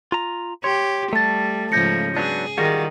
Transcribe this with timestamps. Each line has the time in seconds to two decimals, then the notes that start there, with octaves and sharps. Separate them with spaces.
0.12 F4 A#5
0.64 G4 C#5 C6
1.13 G3 A3 A5 A6
1.72 G#2 C#3 F3 G6 A#6 C#7
2.17 F#3 B3 D4 G#4
2.58 D#3 G3 F4 F#4 G#4 A#6